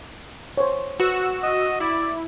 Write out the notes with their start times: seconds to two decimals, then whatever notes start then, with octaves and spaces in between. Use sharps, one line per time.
0.57 C5 C#5
1.00 F#4 B4 E6
1.43 D#5
1.80 E4 D5